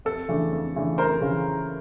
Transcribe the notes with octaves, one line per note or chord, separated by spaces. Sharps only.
F2 A4
C#3 E3 A3 D4
F2
C#3 E3 A3 D4
F2 A#4 C5
C#3 E3